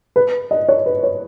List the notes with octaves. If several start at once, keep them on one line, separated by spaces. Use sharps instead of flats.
B4
D#5
C#5
B4
C#5